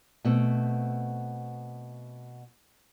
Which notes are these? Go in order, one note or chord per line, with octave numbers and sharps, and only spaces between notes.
B2 A3 C4